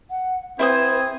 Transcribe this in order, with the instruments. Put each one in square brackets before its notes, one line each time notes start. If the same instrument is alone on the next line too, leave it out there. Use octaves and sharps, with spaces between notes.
[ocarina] F#5
[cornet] C4 [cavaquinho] E4 C5 D#6 [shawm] G#4 [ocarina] B4